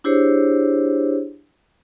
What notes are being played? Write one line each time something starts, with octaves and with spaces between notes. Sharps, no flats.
D4 E4 G4 G#4 C5 C#5